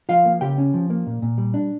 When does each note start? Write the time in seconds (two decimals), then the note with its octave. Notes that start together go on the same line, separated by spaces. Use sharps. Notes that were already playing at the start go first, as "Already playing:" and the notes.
0.09 F3 F4 F5
0.25 A#3
0.41 C#3 G4 G5
0.58 C#4
0.74 F3
0.90 A#3
1.07 A#2
1.22 A#2
1.38 G3
1.54 D4